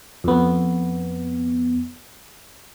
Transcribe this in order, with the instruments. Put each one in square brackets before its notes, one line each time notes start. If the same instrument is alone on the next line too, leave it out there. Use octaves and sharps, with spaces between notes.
[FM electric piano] F2 B3